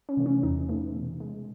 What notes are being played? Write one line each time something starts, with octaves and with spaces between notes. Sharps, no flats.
C#4
C3 E3 A3
C#4
E2 D#4
C3 E3 A3
B2
G#3